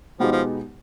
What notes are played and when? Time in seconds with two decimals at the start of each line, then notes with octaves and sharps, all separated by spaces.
0.19 B2 F3 G#3 B3 D#4 G4
0.32 F3